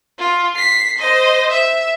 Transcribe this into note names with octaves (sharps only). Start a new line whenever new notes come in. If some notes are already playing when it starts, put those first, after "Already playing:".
F4
B6 C7
C5 D#5
E5